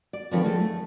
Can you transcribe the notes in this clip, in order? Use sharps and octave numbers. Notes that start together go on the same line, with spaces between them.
D5
D3 D#3 F3 C4 B4 C#5
A3 G#4 A4
A3